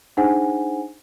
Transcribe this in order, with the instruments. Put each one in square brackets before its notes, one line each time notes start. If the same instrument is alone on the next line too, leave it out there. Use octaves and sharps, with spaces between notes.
[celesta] D4 D#4 G#4 C5 F#5 G#5